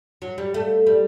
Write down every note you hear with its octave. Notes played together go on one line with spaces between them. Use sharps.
F#3
G3
A3
G3